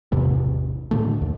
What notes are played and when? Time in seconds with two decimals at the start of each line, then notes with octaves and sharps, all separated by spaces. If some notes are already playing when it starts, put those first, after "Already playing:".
0.12 A1 E2 C3 E3
0.91 A2 D3 A3
1.22 D#2